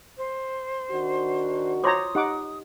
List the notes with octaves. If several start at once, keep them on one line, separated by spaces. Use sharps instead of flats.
C5
D#3 D4 F#4
F4 C5 C#5 A#5 C6 D6 D#6
D#4 G4 F#5 D6